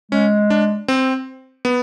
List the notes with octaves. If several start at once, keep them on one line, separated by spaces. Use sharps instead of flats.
G#3 C#4
D4
C4
B3